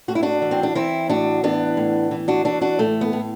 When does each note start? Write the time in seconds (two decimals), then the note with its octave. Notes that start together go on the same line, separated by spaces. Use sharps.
0.08 A2 F#4
0.15 E4
0.23 D4 F#4
0.42 E3
0.51 C4
0.63 D4
0.75 E3 C4 E4
1.09 A2 D4 F#4
1.43 E3 B3 D4
1.77 A2
2.11 E3
2.28 D4 F#4
2.45 E3 D4 F#4
2.61 D4 F#4
2.79 A2 A3
3.01 B3
3.13 A2